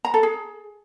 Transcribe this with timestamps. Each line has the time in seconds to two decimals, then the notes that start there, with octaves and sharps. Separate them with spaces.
0.05 A#5
0.14 A4
0.23 G#4